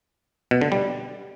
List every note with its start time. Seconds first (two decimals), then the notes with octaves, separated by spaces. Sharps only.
0.51 B2
0.61 D3
0.72 G3